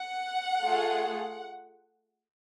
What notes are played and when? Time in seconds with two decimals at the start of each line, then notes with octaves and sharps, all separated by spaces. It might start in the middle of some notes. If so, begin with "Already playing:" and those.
Already playing: F#5
0.63 A3 F4 G#4